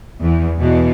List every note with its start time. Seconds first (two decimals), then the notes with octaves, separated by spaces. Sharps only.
0.20 E2
0.58 E2 B2